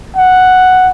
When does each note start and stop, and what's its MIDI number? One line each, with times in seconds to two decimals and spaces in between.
0.17 0.91 78